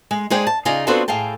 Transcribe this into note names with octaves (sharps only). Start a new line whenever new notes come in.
G#3
G#3 D#4 G#4 C5 D5 G5
A5
C#3 D#4 F4 G#4 D5 D#5
B3 C4 D4 F4 F#4 A4
A2 G#4 F5 G5 A5